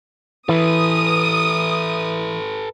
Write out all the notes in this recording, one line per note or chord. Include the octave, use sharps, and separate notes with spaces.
E3 A4 B4 D#6